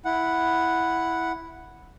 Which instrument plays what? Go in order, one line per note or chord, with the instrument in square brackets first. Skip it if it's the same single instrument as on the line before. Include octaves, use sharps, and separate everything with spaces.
[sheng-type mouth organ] E4 F#5